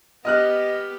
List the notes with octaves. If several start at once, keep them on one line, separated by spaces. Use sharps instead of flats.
B3 G4 D#5 F6 F#6